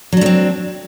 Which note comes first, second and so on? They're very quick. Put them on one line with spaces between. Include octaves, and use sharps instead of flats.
F#3 D4 A3 C4